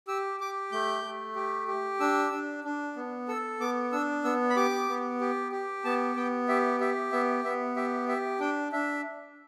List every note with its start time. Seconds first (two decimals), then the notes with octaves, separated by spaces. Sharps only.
0.08 G4 E6
0.40 G4 D6
0.72 A3 G6
1.04 A3
1.36 G4
1.68 G4
2.00 D4 E6
2.32 D4
2.64 D4
2.96 B3
3.28 A4 E6
3.60 B3 D6
3.92 D4 E6
4.24 B3 E6
4.50 B5
4.56 G4 D6
4.89 B3
5.21 G4
5.52 G4
5.85 B3 A5
6.16 B3 G5
6.49 G4 E5
6.80 G4 E5
7.12 B3 E5
7.44 B3 E5
7.76 G4 E5
8.08 G4 E5
8.40 D4 G5
8.73 D4 E5